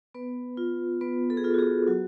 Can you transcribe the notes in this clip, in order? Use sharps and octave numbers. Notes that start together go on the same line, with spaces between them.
B3 B4
F4
B3 B4
A4
G#4
F4 A4
F#4
G#4
F#3 F#4